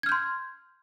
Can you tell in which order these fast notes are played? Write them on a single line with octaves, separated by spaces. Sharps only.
G#6 F6 G6 C6